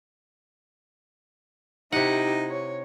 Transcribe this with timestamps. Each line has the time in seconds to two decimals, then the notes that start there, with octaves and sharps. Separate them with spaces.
1.92 C3 D#4 E4 G4 F#5
2.50 C#5